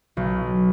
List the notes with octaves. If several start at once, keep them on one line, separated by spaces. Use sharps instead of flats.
B1